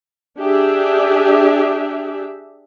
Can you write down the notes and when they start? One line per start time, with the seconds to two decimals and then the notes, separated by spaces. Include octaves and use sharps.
0.39 D4 G4 G#4 E5